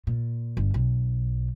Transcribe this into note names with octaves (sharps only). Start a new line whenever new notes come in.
A#2
G1
B1